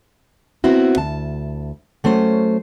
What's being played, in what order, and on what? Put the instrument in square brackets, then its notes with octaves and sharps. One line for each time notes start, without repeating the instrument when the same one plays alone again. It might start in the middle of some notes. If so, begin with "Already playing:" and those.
[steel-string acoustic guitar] B3 C4 E4 F#4
D2 A5
F#3 A3 C#4 C5